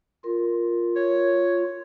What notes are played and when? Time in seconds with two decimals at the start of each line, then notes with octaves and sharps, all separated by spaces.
0.24 F4 A#4
0.96 C#5